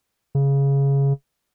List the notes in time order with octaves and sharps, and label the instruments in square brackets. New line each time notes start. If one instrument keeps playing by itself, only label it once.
[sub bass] C#3